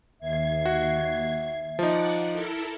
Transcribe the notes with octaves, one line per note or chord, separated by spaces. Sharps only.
D#2 E5 G#6 C7
F#4
F3 D#4 D5 F#5
E4 A4 A#4